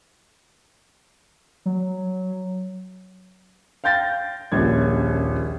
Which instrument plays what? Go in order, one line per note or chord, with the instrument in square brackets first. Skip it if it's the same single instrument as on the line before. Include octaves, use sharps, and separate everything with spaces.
[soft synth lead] F#3
[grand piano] F5 G5 G6 A6 A#6
D#1 A#1 C#4 G#6